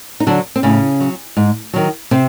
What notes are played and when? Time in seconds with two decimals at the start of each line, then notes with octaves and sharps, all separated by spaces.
0.20 D#4
0.27 D3 F#3 D4
0.56 C4
0.63 A2 C#3 C#4
1.00 F#3
1.37 G#2
1.73 D#3 F#3
2.11 C3 C4